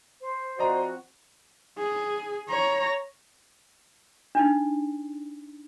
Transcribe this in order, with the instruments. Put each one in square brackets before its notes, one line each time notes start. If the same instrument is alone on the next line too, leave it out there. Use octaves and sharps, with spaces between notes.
[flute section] C5
[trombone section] F3 C4 F#4 [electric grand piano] D5 D#5 A#5
[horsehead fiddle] G#4
C#5 A#5
[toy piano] D4 D#4